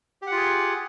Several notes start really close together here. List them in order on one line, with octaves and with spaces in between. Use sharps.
G4 F#5 F4 G#4